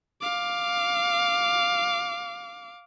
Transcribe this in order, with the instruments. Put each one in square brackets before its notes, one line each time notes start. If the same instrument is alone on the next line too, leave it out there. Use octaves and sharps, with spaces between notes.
[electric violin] F5 D6